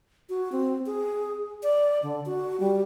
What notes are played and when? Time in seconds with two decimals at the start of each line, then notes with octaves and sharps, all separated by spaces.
0.29 F#4
0.52 C4
0.86 G#4
1.63 D5
2.03 D3
2.26 F#4
2.60 G3